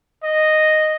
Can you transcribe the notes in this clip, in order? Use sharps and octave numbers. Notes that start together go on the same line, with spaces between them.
D#5